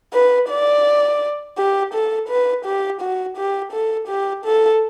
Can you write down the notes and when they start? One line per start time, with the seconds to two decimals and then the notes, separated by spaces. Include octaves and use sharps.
0.14 B4
0.50 D5
1.58 G4
1.94 A4
2.29 B4
2.65 G4
3.01 F#4
3.37 G4
3.73 A4
4.08 G4
4.45 A4